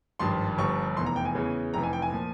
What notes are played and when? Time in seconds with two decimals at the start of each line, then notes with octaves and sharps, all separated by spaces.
0.19 G#1 G2 F3 C6
0.58 G1 G2 F3 C#6
0.97 F1 E2 E3 C6
1.06 A#5
1.16 G5
1.25 G#5
1.35 E2 C#3 E3
1.74 F1 F2 E3 A#5
1.83 G#5
1.93 G5
2.02 G#5
2.12 A#2 F3